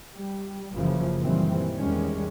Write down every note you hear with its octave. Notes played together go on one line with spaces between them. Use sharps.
G3
F#1 F#2 C#3 E3 F3
F#2 A#2 D#3 E3 G3 C4
E2 D#3 G3 G#3 C#4